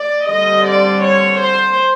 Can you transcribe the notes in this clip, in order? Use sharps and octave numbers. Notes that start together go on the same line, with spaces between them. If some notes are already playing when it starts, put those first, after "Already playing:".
Already playing: D5
D3 G3 C4 D#5
D5
C#5
C5